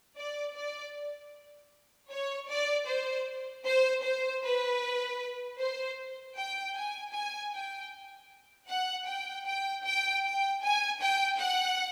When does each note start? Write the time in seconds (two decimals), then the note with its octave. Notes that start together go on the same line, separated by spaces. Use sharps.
0.16 D5
0.55 D5
2.10 C#5
2.49 D5
2.87 C5
3.65 C5
4.03 C5
4.43 B4
5.59 C5
6.36 G5
6.75 G#5
7.13 G#5
7.53 G5
8.69 F#5
9.07 G5
9.46 G5
9.85 G5
10.24 G5
10.63 G#5
11.01 G5
11.40 F#5